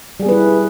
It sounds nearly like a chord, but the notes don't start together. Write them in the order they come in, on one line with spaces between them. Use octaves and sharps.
G3 G#4 B3 B4 E4